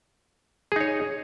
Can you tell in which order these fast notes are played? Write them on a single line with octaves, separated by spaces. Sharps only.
G#4 D#4 C#5